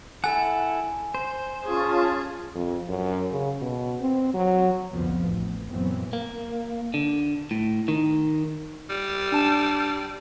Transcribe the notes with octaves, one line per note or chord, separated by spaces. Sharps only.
E4 A4 F#5 G#5
C5
C#4 F4 G#4 A5
F2
F#2
C#3
B2
C4
F#3
C2 F2 D3 F3 B3
A1
F#2 A#2 E3 F#3 B3 C4
A#3
D3
A2
D#3
G3
D4 A5 E7